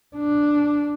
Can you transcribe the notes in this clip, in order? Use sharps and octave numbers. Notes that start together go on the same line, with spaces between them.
D4